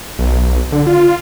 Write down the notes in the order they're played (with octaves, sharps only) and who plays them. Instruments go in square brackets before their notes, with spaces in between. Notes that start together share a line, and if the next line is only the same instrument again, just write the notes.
[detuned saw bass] B1
D3
F4